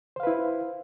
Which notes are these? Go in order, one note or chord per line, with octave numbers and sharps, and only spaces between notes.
E4 B4 C5 F5